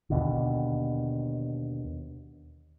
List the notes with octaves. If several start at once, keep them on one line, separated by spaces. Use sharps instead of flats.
D#2 B2 D3